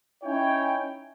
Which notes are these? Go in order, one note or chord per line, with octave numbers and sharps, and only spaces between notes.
C#4 D#4 E4 C#5 G5